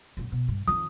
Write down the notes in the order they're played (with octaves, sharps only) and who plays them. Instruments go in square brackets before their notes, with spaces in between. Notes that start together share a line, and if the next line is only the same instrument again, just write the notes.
[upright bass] F#2 A#2
B2
G2
[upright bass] F2 D#3 [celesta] D#6